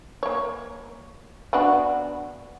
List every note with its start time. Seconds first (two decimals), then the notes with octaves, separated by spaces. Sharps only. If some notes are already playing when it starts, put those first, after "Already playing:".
0.23 A#3 C#5
1.53 B3 D4 F#4